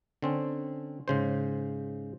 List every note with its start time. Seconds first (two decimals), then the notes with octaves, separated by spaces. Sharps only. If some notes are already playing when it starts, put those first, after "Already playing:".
0.22 D3 C4 C#4
1.08 G#2 C#3 C5